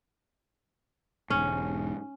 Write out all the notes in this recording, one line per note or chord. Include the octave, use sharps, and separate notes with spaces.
E1 G#2 C#4